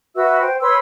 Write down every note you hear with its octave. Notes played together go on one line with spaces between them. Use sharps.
F#4 B4 E5 E6
C5 G5
B4 C#5 C6 E6